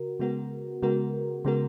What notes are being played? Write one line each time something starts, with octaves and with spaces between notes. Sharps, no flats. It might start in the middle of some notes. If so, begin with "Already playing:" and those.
Already playing: C#3 F#4 A#4
C#3 G#3 B3 F#4 A#4
C#3 G#3 B3 F#4 A#4
C#3 G#3 B3 F#4 A#4